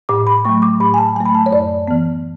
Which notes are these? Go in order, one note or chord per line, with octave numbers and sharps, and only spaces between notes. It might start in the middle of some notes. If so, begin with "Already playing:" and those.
A2 D6
B5
F#3 A3 C#6
D6
A2 B5
G#5
A5
F#3 A3 G#5
B5
A5
C#5
F#2 D5
E3 B3